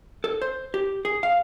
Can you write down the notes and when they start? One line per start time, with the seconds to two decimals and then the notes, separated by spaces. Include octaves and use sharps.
0.24 A4
0.42 C5
0.74 G4
1.05 G#4
1.23 F5